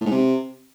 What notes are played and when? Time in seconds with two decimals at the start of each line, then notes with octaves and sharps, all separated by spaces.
0.01 A2
0.06 G#2
0.11 C3